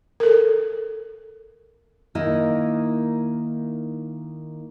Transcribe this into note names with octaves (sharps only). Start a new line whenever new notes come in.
A4 A#4
D#3 A#3 D#4 E4 D#5